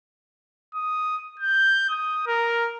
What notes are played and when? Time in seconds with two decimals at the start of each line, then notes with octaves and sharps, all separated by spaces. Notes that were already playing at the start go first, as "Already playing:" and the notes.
0.75 D#6
1.39 G6
1.89 D#6
2.27 A#4